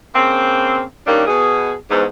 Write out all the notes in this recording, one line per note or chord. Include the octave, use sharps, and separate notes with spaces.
C#3 A#3 C4
D#3 G3 A#3 C#4 D4
B2 G#4
E2 G#2